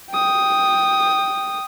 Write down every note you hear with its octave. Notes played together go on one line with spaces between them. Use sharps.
G5 D#6